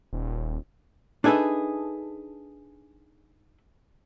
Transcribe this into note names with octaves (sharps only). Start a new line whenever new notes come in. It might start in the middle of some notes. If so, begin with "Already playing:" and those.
D#1
D4 D#4 G#4 A4 B4 E5